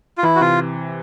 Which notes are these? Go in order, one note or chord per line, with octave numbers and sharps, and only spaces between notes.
F4
E3 E4
F#4
C3 F4